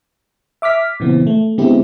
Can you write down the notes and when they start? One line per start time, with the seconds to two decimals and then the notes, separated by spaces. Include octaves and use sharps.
0.62 E5 D6 F6 B6
1.00 A#2 C#3 E3 B3 C4
1.27 A3
1.58 D3 G#3 B3 C4 E4 G4